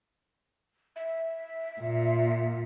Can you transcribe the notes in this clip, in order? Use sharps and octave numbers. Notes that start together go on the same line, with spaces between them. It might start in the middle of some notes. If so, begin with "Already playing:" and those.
E5
A#2